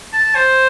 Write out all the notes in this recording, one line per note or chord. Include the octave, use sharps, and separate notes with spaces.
A5
C5